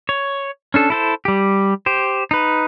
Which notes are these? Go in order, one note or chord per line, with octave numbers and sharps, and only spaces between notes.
C#5
C#4 D4 A4
E4 A4 C5
G3 G4
G4 C5
D#4 B4